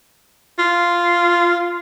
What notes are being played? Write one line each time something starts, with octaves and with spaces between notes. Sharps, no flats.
F4